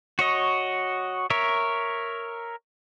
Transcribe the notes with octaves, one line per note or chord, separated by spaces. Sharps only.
F#4 C#5 D#5
A#4 C#5 E5